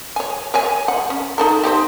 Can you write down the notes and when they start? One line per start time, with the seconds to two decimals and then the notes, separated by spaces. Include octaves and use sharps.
0.16 C#5 G#5
0.54 A#4 C#5 G#5
0.88 F#5
1.10 C#4
1.38 D#4 A4 A#4
1.63 C4 D#4 G4